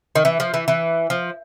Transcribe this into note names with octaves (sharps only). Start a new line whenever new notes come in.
D#3
E3
F3
E3
E3
F3